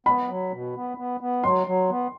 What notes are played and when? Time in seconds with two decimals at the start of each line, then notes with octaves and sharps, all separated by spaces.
0.06 B3 B5
0.28 F#3
0.51 B2
0.75 B3
0.97 B3
1.21 B3
1.43 F#3 C6
1.67 F#3
1.90 B3